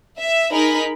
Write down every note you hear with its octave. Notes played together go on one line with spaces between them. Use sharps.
E5
D#4 G#4 A#4 B5 B6